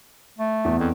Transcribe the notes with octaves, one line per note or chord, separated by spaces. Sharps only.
A3
E2
F2